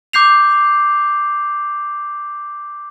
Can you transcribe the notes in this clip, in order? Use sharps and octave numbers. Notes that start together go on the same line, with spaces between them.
D6 G6 C7 F7